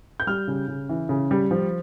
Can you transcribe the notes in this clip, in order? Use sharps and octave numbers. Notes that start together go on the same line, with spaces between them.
G6
G3 F6
C#3
C#3
E3
C#3
G3
F3